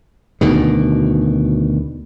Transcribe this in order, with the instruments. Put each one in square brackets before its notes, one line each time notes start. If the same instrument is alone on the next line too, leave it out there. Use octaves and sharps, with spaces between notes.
[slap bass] D2 B2 D#3